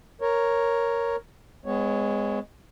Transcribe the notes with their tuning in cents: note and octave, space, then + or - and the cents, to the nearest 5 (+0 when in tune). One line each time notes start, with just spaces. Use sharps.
A#4 +0 C#5 +0
G#3 -10 B3 +40 C#5 +0